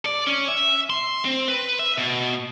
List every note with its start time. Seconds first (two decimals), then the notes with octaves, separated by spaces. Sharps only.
0.06 D5
0.27 C#4
0.48 E5
0.90 C6
1.25 C4
1.48 B4
1.79 E5
1.98 B2